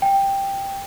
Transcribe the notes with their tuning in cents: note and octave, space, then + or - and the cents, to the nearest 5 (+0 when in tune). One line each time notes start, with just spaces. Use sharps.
G5 +5